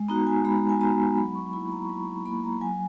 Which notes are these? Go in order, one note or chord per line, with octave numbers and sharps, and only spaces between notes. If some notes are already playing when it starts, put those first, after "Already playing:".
Already playing: G#3
B3 D#4 F#4 A#5
G#5
G#3 B5
G#5
B3 D#4 F#4 A#5
F#3 B5
C#6
A#3 E4 B5
A#5
C#6
F#3 B5
B5
A#3 E4 B5
A#5
F#3 G#5